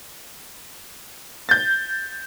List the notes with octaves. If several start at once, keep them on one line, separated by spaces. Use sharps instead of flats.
G6 A6